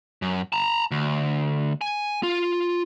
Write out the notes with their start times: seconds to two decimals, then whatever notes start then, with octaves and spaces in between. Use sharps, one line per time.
0.22 F#2
0.53 A5 A#5
0.91 D2
1.81 G#5
2.23 F4